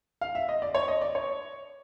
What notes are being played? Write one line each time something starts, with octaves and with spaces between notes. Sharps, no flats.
F5
E5
D#5
D5
C#5
D#5
D5
C#5